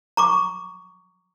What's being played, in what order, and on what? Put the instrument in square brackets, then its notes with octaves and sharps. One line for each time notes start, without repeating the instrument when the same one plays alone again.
[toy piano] A#5 C#6 D6